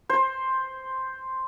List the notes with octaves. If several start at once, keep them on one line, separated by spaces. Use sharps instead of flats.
C5